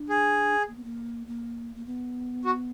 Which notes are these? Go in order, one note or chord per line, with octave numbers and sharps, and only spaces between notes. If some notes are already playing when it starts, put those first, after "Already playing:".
Already playing: D4
G#4
A#3
B3
A#3
A#3
A#3
B3
F#4